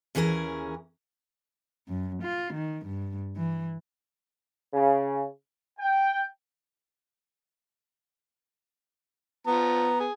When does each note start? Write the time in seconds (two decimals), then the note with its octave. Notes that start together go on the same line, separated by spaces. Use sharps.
0.15 D#2 E3 C#4 G#4 A#4
1.88 F#2
2.23 F4
2.54 D#3
2.86 G2
3.37 E3
4.73 C#3
5.79 G5
9.47 F3 B3 A#5
10.00 G#4